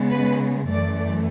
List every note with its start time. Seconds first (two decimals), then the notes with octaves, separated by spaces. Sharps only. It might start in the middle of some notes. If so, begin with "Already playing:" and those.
Already playing: C#3 G#3 B3
0.11 B4
0.68 F#2 E3 A3 D5